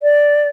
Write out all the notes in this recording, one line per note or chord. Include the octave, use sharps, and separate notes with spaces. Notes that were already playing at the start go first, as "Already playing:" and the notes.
D5